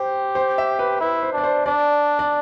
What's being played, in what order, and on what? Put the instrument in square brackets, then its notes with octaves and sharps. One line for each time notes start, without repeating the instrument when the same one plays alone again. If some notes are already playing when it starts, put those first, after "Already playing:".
Already playing: [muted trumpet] G4 [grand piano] C5
[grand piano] C5
E5
B4
[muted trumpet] E4 [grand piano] B4
[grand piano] C5
[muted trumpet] D4 [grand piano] D5
[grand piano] C5
[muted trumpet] D4 [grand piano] D5
[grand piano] D5